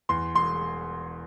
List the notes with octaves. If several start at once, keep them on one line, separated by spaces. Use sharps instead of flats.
E2 C6
E1 C6